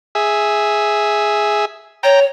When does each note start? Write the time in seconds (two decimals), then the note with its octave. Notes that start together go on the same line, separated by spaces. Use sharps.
0.15 G#4 E5
2.03 C#5 G5 A#5